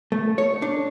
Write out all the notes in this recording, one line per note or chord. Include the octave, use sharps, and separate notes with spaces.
A3
C#5
D4